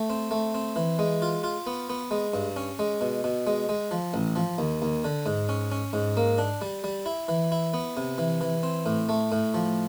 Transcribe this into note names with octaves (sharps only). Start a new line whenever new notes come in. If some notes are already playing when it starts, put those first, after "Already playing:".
Already playing: A3
C4
A3
C4
E3
G#3
F4
F4
B3
B3
G#3
G2
C#4
G#3
B2
B2
G#3
G#3
F3
A1
F3
D#2
D#2
D3
G#2
C#4
C#4
G#2
A#3
D4
G3
G3
E4
E3
E4
B3
C3
E3
E3
C4
A2
A3
A2
F3